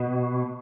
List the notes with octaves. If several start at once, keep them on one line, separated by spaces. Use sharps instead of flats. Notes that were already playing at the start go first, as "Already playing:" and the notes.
Already playing: B2